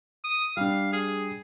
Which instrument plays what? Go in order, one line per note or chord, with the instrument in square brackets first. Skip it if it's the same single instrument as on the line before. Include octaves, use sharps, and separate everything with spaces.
[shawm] D#6
[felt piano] G3 D4 [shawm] F5
[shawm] G#4